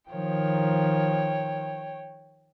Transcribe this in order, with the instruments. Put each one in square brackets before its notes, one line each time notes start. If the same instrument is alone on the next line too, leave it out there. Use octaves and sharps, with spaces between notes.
[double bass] D#3 F3 [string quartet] C#5 G5